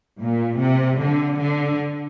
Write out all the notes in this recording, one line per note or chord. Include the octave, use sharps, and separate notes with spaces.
A#2
C3
D3
D3